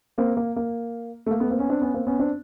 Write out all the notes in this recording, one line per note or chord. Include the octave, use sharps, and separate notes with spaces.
A#3 C4
A#3
A#3
A3
A#3
A3 B3
A#3 C4
B3 C#4
C4 D4
B3 C#4
A#3 C4
B3 C#4
C4 D4